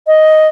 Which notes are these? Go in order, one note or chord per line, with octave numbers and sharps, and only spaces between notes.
D#5